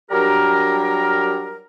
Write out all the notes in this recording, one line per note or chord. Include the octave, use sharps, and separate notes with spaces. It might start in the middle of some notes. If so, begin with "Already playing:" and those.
F#3 G3 D4 G4 A#4